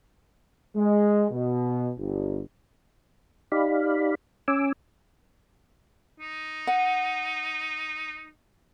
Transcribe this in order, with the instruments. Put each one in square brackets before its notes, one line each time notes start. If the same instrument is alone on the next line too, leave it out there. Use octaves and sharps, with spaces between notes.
[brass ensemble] G#3
B2
G1
[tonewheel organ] D#4 G4 D5 F5 B5
C#4 G#5 D6 E6
[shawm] D#4
[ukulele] F#5